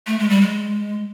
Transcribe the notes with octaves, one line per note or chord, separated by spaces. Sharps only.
A3
G#3
G3
G#3